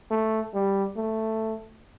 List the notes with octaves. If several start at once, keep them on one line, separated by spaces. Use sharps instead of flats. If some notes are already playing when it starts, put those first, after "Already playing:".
A3
G3
A3